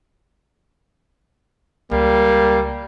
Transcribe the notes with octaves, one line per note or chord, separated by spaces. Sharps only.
C#2 G3 A#3